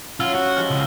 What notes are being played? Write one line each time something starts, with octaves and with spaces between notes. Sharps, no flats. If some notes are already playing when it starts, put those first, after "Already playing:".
F#3 C#4 E4 F4 E6 F6 G7
F#4
F3 G#3 G4 F6
C#2 D#5